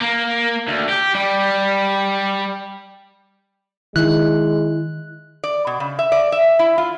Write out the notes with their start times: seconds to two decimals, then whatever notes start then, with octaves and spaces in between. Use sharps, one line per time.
0.02 A#3
0.68 D2
0.89 G4
1.15 G3
3.96 D#3 G#3 E4 F#6
5.44 D5
5.67 B2
5.80 C#3
5.99 E5
6.12 D5
6.32 E5
6.59 E4
6.78 F4